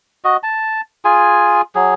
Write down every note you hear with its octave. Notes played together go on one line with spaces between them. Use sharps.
F#4 D#5
A5
F4 G#4 G#5
F#3 G#4